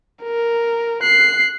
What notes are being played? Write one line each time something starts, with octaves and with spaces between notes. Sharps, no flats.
A#4
F#6 C7